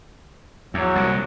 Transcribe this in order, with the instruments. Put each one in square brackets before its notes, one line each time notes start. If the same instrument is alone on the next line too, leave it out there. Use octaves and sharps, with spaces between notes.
[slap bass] E2 [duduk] F#3
[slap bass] C2 A#2